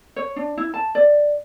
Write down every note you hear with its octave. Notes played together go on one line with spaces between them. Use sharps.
C#5
D4
E4
A5
D5